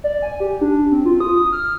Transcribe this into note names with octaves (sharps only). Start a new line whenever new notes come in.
D5
G#5
G4
D4
C4
F4
D#6
D#6
F6